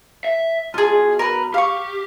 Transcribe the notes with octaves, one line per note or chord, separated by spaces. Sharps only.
E5
B1 F4 G#4
A#4 B4
G4 F5 C#6